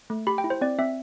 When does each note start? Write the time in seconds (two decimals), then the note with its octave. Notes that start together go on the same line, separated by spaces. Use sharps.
0.10 A3
0.27 G4 B5
0.38 G5
0.44 E4
0.50 C5
0.61 C4 D5
0.79 C4 E5